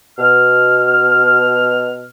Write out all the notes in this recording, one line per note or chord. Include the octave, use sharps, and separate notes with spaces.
B2 F6